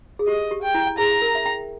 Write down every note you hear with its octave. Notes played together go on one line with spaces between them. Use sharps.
G#4
G4 D#5
G4
G5
E4
G#4 A#5
A#4
E5
G5